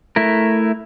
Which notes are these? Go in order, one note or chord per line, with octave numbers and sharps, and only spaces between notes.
A3 E4 A#4